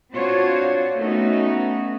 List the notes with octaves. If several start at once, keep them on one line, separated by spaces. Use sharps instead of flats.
C4 D4 F4 F#4 C5 C#5
A3 B3 C#4 D#4 F#4